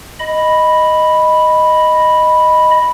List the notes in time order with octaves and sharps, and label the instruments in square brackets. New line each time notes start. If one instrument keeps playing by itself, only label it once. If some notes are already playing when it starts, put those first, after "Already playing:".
[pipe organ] D#5 B5